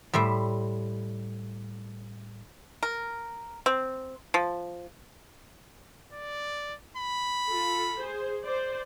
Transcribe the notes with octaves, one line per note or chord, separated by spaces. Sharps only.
A2 G3 C5 E5
A#4
C4
F3
D5
B5
F4 A4
G#4 C5
C5 D5